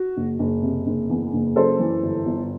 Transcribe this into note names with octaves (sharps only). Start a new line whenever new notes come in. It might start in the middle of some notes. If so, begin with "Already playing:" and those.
Already playing: F#4
F#1
F#1
C3
F#1
E2
F#1
F#2 A4 C5
E3
G1
G1